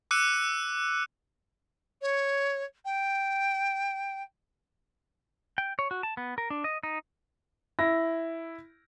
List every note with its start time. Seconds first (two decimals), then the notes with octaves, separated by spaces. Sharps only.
0.11 D6 E6 F#6 C#7 D#7
2.02 C#5
2.85 G5
5.58 G5
5.79 C#5
5.91 F#4
6.03 A5
6.17 B3
6.38 A#4
6.50 D4
6.64 D#5
6.83 D#4
7.79 E4 A#6